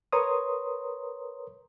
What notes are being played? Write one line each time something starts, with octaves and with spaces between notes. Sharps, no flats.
A#4 B4 C#5 A#5 C6 D#6